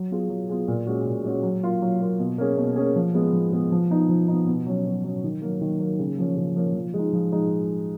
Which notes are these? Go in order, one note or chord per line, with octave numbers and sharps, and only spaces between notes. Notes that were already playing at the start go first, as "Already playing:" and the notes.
Already playing: F#3
B3 F4 G#4
F#3
B3 F4 G#4
A#2
G#3 C#4 F#4
A#2
G#3 C#4 F#4
F#3
A#3 F4
F#3
A#3 F4
B2
A#3 C#4 G#4
B2
A#3 C#4 G#4
F3
G#3 B3
F3
G#3 B3
F3
B3 D#4
F3
B3 D#4
B2
F#3 C#4
B2
F#3 C#4
D#3
F#3 A#3
D#3
F#3 A#3
C#3
F3 A#3 C#4
C#3
F3 A#3 C#4
F3
G#3 D#4
F3
G#3 D#4